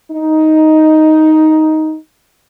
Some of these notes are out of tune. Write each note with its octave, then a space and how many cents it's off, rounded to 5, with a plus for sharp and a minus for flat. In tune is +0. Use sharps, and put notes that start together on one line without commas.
D#4 +5